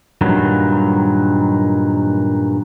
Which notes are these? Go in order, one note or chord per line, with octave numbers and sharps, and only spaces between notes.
G2 A#2 D#3 F#3